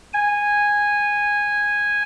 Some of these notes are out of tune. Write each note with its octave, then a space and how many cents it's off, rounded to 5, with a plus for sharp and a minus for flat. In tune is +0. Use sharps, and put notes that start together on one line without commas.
G#5 -10